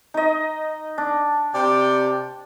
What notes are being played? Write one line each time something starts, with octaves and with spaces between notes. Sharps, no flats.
D#4 D#5
D4
C3 D5 G5